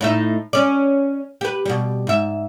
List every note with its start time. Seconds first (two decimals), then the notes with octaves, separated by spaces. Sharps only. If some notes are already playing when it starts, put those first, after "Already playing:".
0.01 A2 D#4 E5
0.53 C#4 D5
1.41 G4 B4
1.66 B2 G3
2.07 G#2 E5